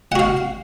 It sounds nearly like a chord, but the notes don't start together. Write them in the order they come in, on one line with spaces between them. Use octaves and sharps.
F#5 F#4 F5